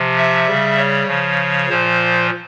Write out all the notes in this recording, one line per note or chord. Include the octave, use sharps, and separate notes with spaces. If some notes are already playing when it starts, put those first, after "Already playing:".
Already playing: C3 F3
E5
C#3 G3
C#5
C#3 F3
A#2 F3 C5